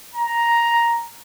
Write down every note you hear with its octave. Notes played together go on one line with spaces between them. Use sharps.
A#5